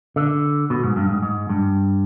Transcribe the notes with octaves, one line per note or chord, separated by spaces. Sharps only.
D3
B2
G#2
G2
G#2
G#2
G2